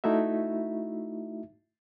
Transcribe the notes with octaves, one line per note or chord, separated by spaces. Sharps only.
A3 D#4 E4 F#4 E5